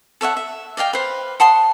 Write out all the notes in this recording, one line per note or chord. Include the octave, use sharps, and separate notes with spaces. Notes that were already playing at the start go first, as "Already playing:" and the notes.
A4 C#5 E5 F#5
E5
D5 D#5 F5 G5
B4 C5
F#5 A5 C6 D#6